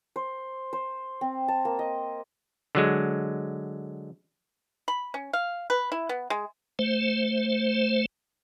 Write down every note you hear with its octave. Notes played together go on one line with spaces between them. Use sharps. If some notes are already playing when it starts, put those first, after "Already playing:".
C5
C5
C4
A5
A#3
D#5
D3 F#3 G#3
B5
C#4
F5
B4
E4
B3
G#3
A3 C5